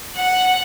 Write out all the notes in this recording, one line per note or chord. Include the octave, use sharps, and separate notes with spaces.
F#5